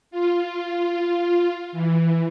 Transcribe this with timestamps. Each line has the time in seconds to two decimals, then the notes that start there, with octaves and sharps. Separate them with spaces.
0.11 F4
1.72 E3